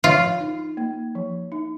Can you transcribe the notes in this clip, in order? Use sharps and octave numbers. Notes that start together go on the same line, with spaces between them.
F3 F4
D#4
A#3
F3
D#4